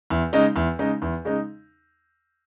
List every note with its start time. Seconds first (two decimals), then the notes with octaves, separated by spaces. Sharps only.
0.10 E2
0.33 C#3 G#3 D#4
0.56 E2
0.79 C#3 G#3 D#4
1.02 E2
1.25 C#3 G#3 D#4